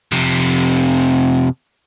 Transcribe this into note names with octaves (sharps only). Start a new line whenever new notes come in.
F2 C3